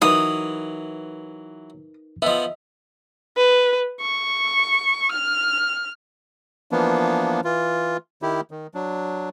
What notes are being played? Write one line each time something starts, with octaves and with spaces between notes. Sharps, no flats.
E3 F#3 D#4 A#4 B4 D#6
F3 B3 D#5 E5
B4
C#6
F6
E3 F3 A#3 B3 D4
E3 F4
D#3 E4 G4
D#3
F#3 D4